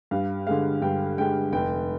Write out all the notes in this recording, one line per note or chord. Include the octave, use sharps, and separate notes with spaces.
G2 F5
D3 G#3 F5
G2 G5
D3 G#3 G5
F1 G5